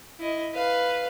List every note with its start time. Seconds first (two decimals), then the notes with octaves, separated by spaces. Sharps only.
0.19 E4 D#5
0.53 B4 F5